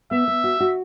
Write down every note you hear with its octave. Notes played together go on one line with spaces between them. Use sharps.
B3 E5
B3
F#4
F#4